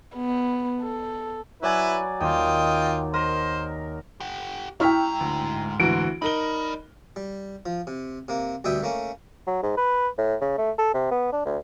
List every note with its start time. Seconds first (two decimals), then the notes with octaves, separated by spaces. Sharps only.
0.16 B3
0.81 A4
1.63 F#3 E4 B4 D5 G#5
2.21 D#2 F4 D#5 G5 D6
3.14 A#4 C5 D#5
4.20 G4 F#5
4.80 G#2 E4 G5 A#5 C#6 F6 B6
5.20 D2
5.80 D2 E3 F#4 D7
6.22 D#4 A#4 D5 B5 G7
7.16 G3
7.66 F3
7.87 C3
8.28 C3 A#3
8.64 D2 B2 G3 E5 G5 D#6
8.82 A3 A#3 C#4
9.47 F#3
9.63 G#2
9.77 B4
10.18 A2
10.41 C#3
10.58 A3
10.78 A4
10.94 C3
11.11 B3
11.33 D4
11.45 D2